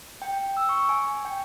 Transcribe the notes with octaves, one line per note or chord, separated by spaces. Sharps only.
G5
E6
C#6
G#5
G5